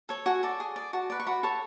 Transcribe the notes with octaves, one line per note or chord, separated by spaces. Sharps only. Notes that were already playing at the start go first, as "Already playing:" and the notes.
A4 C#5
F#4 G#5
A4 D5
G#4
D5
F#4 A5
B4 D5
C#6
F#4 B5
A4 C#5